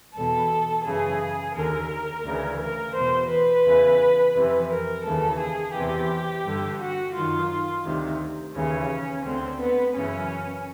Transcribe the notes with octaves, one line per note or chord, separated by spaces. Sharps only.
E2 B2 A4
F#2 C#3 E3 G#4
D#2 D3 A#4
D2 C#3 E3
A#4
E2 B2 C5
B4
E2 C#3 E3
F2 C3 E3
A#4
D#2 C#3 E3 A4
G#4
E2 C3 E3 G4
G2 D3
F#4
F#2 D#3 F4
D2 C3 D#3
D#2 C#3 E3 C#4
D2 D3 C4
B3
F#2 C#3 E3 C#4